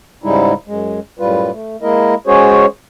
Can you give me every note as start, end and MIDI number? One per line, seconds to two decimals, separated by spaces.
0.24 0.53 44
0.24 0.53 49
0.24 0.53 55
0.24 0.53 56
0.24 0.53 63
0.24 0.53 64
0.67 1.00 42
0.67 1.00 56
1.19 1.51 42
1.19 1.51 45
1.19 1.51 55
1.19 1.51 65
1.19 1.51 71
1.51 1.77 57
1.82 2.14 56
1.82 2.14 58
1.82 2.14 64
1.82 2.14 70
1.82 2.14 75
2.27 2.66 56
2.27 2.66 61
2.27 2.66 66
2.27 2.66 68
2.27 2.66 72
2.27 2.66 73